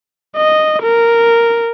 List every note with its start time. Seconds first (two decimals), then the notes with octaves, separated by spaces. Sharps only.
0.37 D#5
0.83 A#4